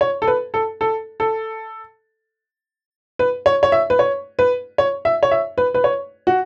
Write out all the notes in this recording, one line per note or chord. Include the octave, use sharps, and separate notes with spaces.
C#5
A4
B4
A4
A4
A4
B4
C#5
C#5
E5
B4
C#5
B4
C#5
E5
C#5
E5
B4
B4
C#5
F#4